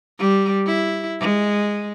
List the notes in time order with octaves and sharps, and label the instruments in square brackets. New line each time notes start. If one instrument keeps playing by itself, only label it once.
[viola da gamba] G3
E4
G#3